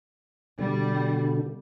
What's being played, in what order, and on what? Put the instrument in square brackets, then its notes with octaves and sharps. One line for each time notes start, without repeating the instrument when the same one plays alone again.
[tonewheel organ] B2 D3 [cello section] G3